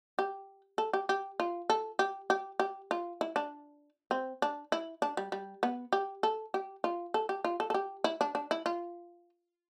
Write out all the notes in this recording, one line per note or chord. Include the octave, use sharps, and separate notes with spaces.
G4
A4
G4
G4
F4
A4
G4
G4
G4
F4
E4
D4
C4
D4
E4
D4
G3
G3
B3
G4
A4
G4
F4
A4
G4
F4
A4
A4
G4
E4
D4
D4
E4
F4